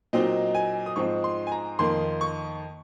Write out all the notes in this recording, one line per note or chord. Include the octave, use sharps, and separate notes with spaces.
A#2 F#3 C4 D#4 D#5
G#5
D#6
G#2 F3 C4 D#4 C#6
C6
G#5
A#5
F2 D#3 A#3 C6
C#6